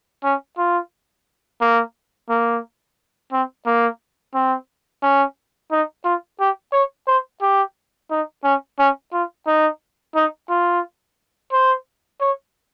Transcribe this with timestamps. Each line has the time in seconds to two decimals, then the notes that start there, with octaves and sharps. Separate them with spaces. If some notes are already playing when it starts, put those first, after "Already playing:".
0.24 C#4
0.58 F4
1.61 A#3
2.29 A#3
3.32 C4
3.66 A#3
4.35 C4
5.03 C#4
5.72 D#4
6.05 F4
6.40 G4
6.73 C#5
7.07 C5
7.42 G4
8.11 D#4
8.44 C#4
8.79 C#4
9.13 F4
9.47 D#4
10.15 D#4
10.49 F4
11.53 C5
12.21 C#5